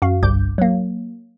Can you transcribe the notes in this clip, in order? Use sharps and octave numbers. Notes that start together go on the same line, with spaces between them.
F#2 F#4 F5
G1 C2 G2 D6 G6
F#3 A#3